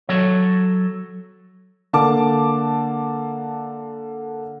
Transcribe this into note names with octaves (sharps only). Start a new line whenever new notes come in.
F#3 A4 C#5
D3 A#3 A5 D6